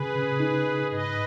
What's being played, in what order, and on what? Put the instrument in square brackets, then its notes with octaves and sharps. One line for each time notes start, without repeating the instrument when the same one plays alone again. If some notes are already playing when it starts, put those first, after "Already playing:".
Already playing: [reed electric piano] C#3 [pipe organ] G#4 B4
[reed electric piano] C#3
D#4
D#4
[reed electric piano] G#2 [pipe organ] B4 D#5